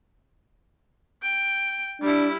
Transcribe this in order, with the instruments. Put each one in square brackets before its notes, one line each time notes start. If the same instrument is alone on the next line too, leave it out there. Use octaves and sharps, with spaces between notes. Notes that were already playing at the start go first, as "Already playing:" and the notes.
[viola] G5
[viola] G3 E4 [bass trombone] D4